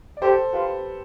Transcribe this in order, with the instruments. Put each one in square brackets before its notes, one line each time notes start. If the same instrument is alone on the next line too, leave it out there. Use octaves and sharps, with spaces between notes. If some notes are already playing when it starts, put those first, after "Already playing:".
[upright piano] D5
[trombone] G4 [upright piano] A4 C5
[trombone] F4 [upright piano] G4 B4